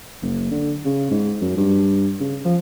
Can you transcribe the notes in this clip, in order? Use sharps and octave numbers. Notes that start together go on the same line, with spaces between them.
F#1
D3
C#3
G#2
F#2
G2
C#3
F3